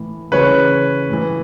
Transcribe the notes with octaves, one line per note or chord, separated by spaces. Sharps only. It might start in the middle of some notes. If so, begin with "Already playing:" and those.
Already playing: A2 E3
C#3 E3 B4 C#5
A2 E3